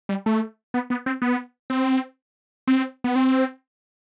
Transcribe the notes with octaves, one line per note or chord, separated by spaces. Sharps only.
G3
A3
B3
B3
C4
B3
C4
C4
B3
C4